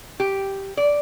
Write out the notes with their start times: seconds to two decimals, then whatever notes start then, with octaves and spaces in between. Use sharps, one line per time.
0.20 G4
0.77 D5